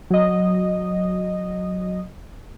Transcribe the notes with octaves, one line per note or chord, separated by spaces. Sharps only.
F#3 D#5